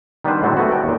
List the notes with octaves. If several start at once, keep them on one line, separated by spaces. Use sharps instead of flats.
D#3 G3 B3 D4 B4 C5
A2 D3 F#3 G#3 A3 C4
A3 B3 F#4
G5
D#2 A#2